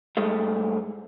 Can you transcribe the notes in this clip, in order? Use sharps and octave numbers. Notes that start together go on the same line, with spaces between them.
G2 G#3 A3